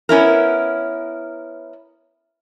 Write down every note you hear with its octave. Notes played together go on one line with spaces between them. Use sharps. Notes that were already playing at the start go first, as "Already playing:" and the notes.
B3 C#4 E4 A#4